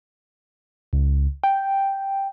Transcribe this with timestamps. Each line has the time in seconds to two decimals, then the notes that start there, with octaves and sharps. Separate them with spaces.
0.93 C#2
1.44 G5